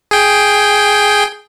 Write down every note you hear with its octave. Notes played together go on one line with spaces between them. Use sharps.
G#4 G5